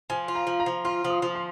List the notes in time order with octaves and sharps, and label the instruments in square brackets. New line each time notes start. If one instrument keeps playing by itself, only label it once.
[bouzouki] F3 [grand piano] G#5
[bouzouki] F4
[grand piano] A#5
[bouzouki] F3
[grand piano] A#5
[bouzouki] F3
[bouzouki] F4 [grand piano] C6
[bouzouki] F3
[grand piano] D#6
[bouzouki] F3
[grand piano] C6